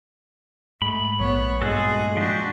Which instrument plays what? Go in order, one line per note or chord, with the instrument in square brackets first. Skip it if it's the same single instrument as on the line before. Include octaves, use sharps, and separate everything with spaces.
[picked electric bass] G#2 [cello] A3 [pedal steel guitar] B5
[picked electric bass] A#1 F#3 [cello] B3 C#5
[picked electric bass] G2 A#2 [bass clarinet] G#3 [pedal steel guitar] F#4 A4 [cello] G#4
[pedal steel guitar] F3 G4 [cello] D4 F#4